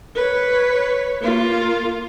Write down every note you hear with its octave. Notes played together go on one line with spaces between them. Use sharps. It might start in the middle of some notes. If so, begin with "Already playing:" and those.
B4 C#5
A#3 F4